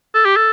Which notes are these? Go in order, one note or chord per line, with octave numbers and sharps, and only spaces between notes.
A4
G4
A4